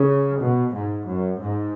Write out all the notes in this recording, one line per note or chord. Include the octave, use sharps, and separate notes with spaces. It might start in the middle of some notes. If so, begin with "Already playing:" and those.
Already playing: C#3
B2
G#2
F#2
G#2